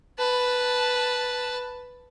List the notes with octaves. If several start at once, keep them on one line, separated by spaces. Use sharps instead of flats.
B4 A5